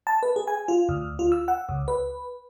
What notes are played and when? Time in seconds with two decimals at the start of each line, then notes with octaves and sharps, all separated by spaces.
0.07 A5
0.23 B4
0.36 G#4
0.47 G#5
0.68 F4
0.89 D2
1.19 F4
1.32 E6
1.48 F#5
1.69 C#2
1.88 B4